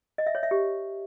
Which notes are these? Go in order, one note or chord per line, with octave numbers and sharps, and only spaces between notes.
D#5
E5
C#5
E5
G4